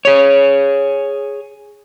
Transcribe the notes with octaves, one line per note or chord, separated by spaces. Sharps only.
G#4 C#5